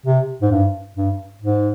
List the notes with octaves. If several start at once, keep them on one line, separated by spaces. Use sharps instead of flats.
C3
G#2
G2
G2
G#2